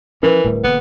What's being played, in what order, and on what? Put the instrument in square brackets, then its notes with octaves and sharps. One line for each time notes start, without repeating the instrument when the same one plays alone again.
[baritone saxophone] E3 [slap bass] F3 C#4 [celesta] A#4 B4
[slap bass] D1 A2 G3
[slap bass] E1 D3 A#3 [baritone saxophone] B3